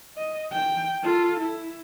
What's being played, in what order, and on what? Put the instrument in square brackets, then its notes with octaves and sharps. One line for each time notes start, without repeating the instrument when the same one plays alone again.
[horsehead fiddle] D#5
G5
F4 A4
E4